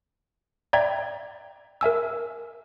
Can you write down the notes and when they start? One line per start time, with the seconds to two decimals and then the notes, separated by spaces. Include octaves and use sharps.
0.73 D5 E5 G5 A#5 G#6
1.81 A#4 E5 G#5 E6